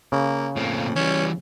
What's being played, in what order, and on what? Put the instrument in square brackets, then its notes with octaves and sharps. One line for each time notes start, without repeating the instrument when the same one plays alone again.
[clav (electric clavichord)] C#3 [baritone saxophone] A#3
[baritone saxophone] F2 [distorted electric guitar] A2 A#3
[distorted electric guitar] E3 G3 [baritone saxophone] C#4